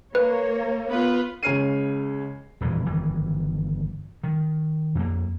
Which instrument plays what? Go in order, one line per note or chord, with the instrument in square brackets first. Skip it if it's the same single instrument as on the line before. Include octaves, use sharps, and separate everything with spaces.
[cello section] A#3 C#5 [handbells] B4
[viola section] B3 F4 B4
[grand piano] C#2 C#3 C#5 F6 C7 D#7
[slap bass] D#1 F2 E3
G1 D#3 E3
D#3
F2 A#3